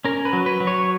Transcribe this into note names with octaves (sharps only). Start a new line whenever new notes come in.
C#4 A#4
B4
F#3
B4
F#3
C#5